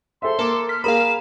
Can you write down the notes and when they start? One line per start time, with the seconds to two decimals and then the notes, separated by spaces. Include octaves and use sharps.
0.22 A4 C5 E5 C6
0.39 A#3 A4 D6
0.69 F6 B6
0.84 A#3 G#4 A#4 F5 B5 E7